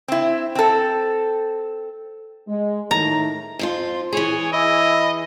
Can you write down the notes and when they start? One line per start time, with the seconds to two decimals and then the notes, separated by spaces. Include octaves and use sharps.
0.08 C4 E4
0.55 C4 A4
2.48 G#3
2.91 A2 D#3 A#5
3.59 F2 F3 F4
4.13 E3 G#4 C#5
4.53 E4 D#5